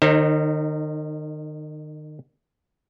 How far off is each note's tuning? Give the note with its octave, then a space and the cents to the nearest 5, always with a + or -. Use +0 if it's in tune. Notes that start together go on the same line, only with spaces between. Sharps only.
D#3 -35 D#4 +0 C5 +40